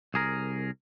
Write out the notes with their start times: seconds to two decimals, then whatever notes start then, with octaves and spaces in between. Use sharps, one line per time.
0.14 C2 G#4 A#4